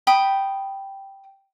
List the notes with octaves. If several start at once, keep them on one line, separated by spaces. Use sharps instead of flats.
G5 B5 D#6